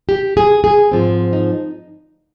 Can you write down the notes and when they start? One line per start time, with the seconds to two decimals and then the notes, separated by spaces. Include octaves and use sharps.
0.09 G4
0.37 G#4
0.64 G#4
0.92 G#2 F3 C4
1.33 D#4